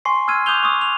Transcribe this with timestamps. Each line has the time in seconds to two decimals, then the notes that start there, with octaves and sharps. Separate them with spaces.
0.05 G#5 C6 C#6 C7
0.28 E6 F6 G#6 D#7
0.46 D6 D#6 F#6 G6 F7 G7
0.63 C#6 D#6
0.81 F7